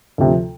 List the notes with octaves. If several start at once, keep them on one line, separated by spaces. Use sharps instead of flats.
D2 C3 F3